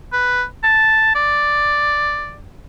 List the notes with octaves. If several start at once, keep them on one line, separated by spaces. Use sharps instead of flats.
B4
A5
D5